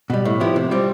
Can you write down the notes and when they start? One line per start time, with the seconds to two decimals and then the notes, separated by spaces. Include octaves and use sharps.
0.10 B2 G3
0.25 A2
0.40 F3 B3 E4 G4
0.56 C3
0.71 G3 C4 F4